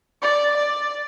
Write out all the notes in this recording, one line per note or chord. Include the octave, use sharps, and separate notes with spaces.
D5
D5